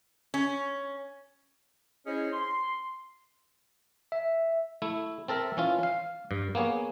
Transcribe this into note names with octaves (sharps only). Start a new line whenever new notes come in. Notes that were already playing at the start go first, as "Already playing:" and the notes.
C#4
C#4 E4 G#4 C5 C#5 D#5
C6
E5
A3 E4
C4 A4 A#4 E5
E3 C#4 F4
F5
G2
A#3 B3 G#4 C#5